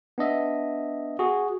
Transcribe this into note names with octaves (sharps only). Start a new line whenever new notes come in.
B3 D4 D#5 E5
F#4 G#4